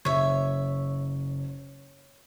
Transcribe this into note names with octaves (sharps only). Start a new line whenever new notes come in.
F#1 C#5 E5